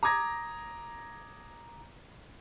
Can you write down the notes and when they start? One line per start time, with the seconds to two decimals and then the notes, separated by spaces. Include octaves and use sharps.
0.03 A#5 D6 D#6 G#6 A#6